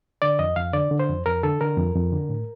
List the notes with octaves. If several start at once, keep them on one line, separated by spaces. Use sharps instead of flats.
D3 D5
F2 D#5
F2 F5
D3 D5
D3
C5
F2
F2 A#4
D3 A4
D3 A#4
F2
F2
D3
A2